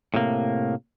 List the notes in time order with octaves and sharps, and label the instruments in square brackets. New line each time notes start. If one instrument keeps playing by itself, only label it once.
[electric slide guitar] A2 C3 A#3